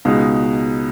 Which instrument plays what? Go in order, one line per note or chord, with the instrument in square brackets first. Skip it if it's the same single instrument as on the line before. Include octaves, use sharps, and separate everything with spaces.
[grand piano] C#2 B2 G#3 B3 D#4